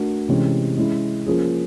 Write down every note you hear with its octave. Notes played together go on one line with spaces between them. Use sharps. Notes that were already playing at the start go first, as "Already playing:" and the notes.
Already playing: A3 D4 F#4 A#4
C3 E3 G#3 C#4
G#3 C#4 E4
F3 A#3 C#4 F4 G#4